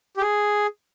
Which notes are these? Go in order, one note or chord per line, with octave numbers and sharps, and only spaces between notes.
G4
G#4